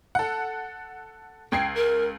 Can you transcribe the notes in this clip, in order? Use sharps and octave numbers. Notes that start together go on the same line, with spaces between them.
A4 F#5
C#2 G5 G#6 C7
A#4